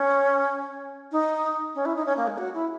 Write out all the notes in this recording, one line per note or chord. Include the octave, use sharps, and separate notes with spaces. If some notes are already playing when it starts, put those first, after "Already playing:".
Already playing: C#4
D#4
C#4
E4
D#4
C#4
A#3
G#3
F#4
E4